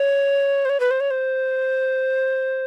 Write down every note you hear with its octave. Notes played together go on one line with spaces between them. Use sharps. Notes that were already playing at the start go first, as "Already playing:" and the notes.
Already playing: C#5
C5
C#5
B4
C5
C#5
C5